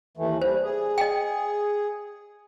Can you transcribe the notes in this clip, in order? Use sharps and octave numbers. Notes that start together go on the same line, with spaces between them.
D#2 E3 A3
G3 C5
G#4
D#5 G5